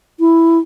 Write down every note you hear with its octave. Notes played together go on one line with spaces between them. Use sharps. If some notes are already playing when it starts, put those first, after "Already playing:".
E4